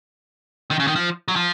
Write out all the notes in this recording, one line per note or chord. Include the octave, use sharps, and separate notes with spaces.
D#3
C#3
D#3
F3
F#3
F3